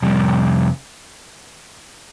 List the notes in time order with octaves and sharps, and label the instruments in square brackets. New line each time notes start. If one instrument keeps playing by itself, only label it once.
[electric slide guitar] F2 C3 G3